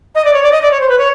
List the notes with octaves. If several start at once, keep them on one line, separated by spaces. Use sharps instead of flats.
D#5
D5
C#5
D5
D#5
D5
C#5
C5
B4
C#5